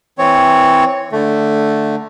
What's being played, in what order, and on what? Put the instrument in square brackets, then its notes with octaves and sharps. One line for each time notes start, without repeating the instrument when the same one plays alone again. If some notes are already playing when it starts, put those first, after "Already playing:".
[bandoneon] E3 C4 C#5
D3 A3